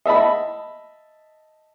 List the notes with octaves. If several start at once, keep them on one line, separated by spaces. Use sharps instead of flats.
D#5 E5 A5 B5